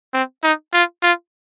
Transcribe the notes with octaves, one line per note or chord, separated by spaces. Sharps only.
C4
D#4
F4
F4